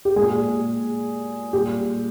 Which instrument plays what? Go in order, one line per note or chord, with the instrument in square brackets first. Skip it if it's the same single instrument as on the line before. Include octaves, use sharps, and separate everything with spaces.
[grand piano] G4
A#2 G#3 G#4
A#2 G3 G4